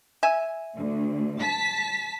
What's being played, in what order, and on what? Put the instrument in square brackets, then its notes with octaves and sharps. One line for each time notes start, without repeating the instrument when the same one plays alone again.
[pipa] E5 G#5
[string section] D2
A5 B6